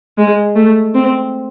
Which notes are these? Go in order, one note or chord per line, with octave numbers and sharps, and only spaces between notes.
G#3
A3
C4